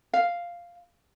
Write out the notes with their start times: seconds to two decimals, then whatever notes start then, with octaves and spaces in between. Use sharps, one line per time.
0.13 F5